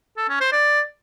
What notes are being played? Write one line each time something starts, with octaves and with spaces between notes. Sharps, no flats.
A4
C#4
C5
D5